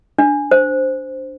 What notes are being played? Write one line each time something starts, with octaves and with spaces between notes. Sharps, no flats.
D4
C5